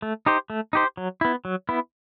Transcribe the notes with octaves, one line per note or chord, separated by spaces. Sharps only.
A3
D#4 G4 C5
A3
D#4 G4 C5
F#3
B3 E4
F#3
B3 E4